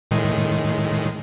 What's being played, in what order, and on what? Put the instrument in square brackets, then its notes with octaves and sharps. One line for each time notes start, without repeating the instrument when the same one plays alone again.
[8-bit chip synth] A2 D#3 G#3